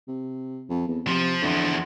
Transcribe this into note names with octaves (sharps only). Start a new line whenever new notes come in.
C3
F2
E2
C3 F3
E2 D3 F3